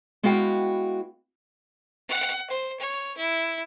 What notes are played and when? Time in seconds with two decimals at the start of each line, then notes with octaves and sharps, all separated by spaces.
0.23 G#3 B3 E4 F#4 F5 G5
2.09 F#5
2.50 C5
2.79 C#5
3.17 E4